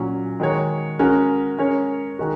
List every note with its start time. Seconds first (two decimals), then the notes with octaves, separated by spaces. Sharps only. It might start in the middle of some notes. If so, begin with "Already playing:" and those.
Already playing: A#2 F#3 C#4
0.40 D#3 G#3 F#4 C#5
0.99 G#3 C#4 F#4 A#4
1.58 G#3 C#4 A#4 C#5
2.19 D#3 G#3 D#4 F#4 A#4